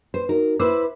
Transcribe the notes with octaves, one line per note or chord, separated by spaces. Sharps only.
B4 C5
D#4 F#4 A#4
E4 B4 C5 D6 E6